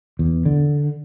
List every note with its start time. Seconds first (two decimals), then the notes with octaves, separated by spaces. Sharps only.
0.19 E2
0.45 D3